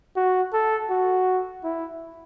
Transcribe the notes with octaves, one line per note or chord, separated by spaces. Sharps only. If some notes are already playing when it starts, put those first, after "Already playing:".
F#4
A4
F#4
E4